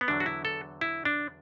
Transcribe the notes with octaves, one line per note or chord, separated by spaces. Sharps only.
B3
E2 D3 F#3 D4
F#4
E4
A4
E4
D4